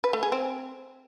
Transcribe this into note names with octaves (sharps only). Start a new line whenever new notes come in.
B4
A3
G#4
C4